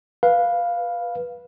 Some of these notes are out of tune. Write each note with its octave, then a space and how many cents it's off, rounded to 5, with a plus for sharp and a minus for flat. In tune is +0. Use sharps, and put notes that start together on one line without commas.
B4 -15 F5 +0